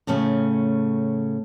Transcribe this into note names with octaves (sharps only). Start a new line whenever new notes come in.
A2 C#3 A3 C#4